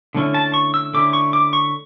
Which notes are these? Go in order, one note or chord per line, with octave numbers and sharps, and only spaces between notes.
D3 A3 C#4 E4
A5
C#6
E6
D3 A3 C#4 E4 D6
C#6
D6
C#6